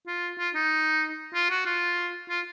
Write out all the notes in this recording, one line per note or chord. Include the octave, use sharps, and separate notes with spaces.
F4
F4
D#4
F4
F#4
F4
F4